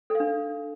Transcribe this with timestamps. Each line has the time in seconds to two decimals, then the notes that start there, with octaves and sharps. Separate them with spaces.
0.10 A4
0.15 F5
0.20 D4